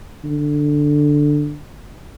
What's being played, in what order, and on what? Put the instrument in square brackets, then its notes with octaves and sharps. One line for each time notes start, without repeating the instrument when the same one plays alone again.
[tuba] D3